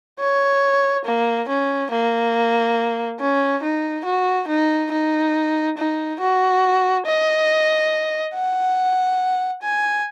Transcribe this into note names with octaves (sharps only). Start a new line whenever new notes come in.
C#5
A#3
C#4
A#3
C#4
D#4
F#4
D#4
D#4
D#4
F#4
D#5
F#5
G#5